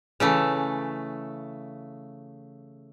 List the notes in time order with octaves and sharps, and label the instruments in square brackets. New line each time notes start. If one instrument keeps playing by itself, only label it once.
[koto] C#3 E3 A3